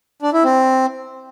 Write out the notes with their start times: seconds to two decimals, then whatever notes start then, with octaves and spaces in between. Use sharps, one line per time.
0.22 D4
0.33 E4
0.44 C4